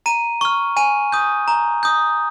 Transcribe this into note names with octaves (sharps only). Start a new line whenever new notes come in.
A#5 D#7
C#6 F6
G#5 D#7
D#6 G6
A#5
D#6 G6